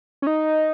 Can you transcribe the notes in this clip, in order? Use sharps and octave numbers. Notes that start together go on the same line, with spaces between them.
C#4
D#4